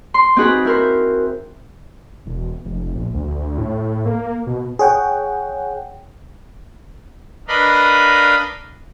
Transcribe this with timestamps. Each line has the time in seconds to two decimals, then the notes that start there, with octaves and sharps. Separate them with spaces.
0.14 C6
0.36 C4 D#4 F#4 G#4 B4 G5
0.65 E4 A#4 C5
2.26 E1
2.65 F1
2.79 F1
2.96 A#1
3.14 D2
3.34 D2
3.58 A2
4.06 A#3
4.47 B2
4.79 G#4 C#5 F#5 G5
7.48 D4 A#4 B4 D#5 F5 B5